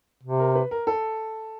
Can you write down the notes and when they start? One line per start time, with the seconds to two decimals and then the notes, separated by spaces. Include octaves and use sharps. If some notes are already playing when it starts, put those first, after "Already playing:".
0.23 C3
0.39 A#4
0.55 B4
0.71 A#4
0.87 A4